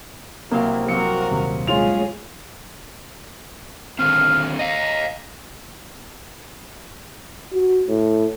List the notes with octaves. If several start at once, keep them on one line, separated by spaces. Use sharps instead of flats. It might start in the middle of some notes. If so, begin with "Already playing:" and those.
C2 F#3 A#3 C4 F5
F#3 A#3 C4 F#4 A#4 C#7
D#1 D#2 C3
G#3 C#4 F4 G#4 F7
D3 D#3 C4 F5
D#5 F5 A#5
F#4
A2